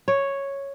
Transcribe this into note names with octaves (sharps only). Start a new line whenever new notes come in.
C#5